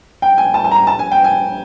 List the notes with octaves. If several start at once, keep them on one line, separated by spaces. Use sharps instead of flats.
G5
G#5
A5
A5
A#5
A5
G#5
G5
G#5